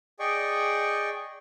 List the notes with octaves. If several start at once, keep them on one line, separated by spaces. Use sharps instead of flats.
G#4 D5 D#5 G5 C#6